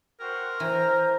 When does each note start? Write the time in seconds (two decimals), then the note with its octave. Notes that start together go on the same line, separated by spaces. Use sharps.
0.20 F#4 A#4 C5 G5
0.60 E3 C5 A#5